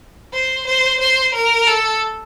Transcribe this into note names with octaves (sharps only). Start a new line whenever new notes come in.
C5
C5
C5
A#4
A4